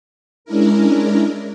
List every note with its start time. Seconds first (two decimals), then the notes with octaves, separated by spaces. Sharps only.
0.45 G#3 C#4 D4 E4 A#4